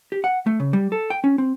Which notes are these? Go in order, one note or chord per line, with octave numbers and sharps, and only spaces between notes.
G4
F#5
A3
C#3
G3
A4
G5
C#4
C4